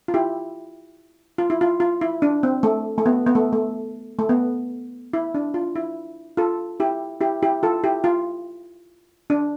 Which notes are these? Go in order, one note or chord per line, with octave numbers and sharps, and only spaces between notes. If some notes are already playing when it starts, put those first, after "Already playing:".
F4
E4 G4
F4
E4
F4
F4
E4
D4
C4
A3
A3
B3
B3
A3
A3
A3
B3
E4
D4
F4
E4
F4 A4
E4 G4
E4 G4
E4 G4
F4 A4
E4 G4
F4
D4